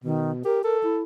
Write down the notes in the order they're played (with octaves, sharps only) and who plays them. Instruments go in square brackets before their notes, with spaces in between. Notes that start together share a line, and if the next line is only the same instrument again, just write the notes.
[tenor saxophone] B2 [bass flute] D#3
[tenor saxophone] G4 [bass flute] A#4
[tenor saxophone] A4 [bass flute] A#4
[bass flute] E4